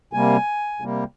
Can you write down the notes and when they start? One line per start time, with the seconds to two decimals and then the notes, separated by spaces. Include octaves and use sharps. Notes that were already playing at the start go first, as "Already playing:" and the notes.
0.13 C3 G3 A#3 G#5
0.81 C3 G3 A#3